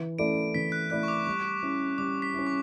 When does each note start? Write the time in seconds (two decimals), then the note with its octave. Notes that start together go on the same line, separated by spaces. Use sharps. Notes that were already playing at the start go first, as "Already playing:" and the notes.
Already playing: E3
0.19 A3 E4 A4 D5 D7
0.54 E3 B6
0.72 F#6
0.90 A3 E4 A4 D5 F#6
1.03 C#6
1.08 D6
1.26 G3 C#6
1.62 C#4 E4
1.98 G3 D6
2.22 B6
2.34 C#4 E4
2.47 C#6